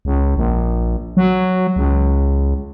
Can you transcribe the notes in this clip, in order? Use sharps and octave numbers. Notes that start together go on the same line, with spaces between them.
C#2
A#1
F#3
C#2